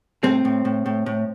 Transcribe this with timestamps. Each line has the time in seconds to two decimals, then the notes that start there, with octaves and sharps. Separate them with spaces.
0.23 A2 C4
0.45 A2
0.65 A2
0.86 A2
1.06 A2